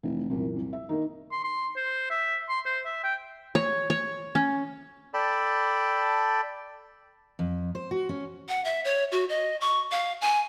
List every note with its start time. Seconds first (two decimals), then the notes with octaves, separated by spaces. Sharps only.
0.03 F1 E3
0.30 C2 F#2 A#2 E3
0.55 C2
0.73 E5
0.89 D#3 A#3 D#4
1.32 C6
1.44 C6
1.76 C5
2.10 E5
2.49 C6
2.65 C5
2.85 E5
3.04 G5
3.55 C#5
3.90 C#5
4.35 C#4
5.14 A4 D5 G5 A5 B5
7.39 F2
7.75 C5
7.91 F#4
8.09 C#4
8.49 F#5
8.65 E5
8.85 C#5
9.12 F#4
9.29 D#5
9.61 C#6
9.91 F5
10.22 G#5